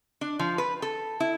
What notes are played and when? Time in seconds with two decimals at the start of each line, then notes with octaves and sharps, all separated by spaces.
0.21 D4
0.39 F3
0.58 B4
0.82 A4
1.20 E4